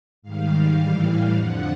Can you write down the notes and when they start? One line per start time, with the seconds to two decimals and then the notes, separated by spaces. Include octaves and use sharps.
0.22 G#2 D#3 G3 F5
0.78 A2 E3 G3
1.33 F2 D3 F3 F#5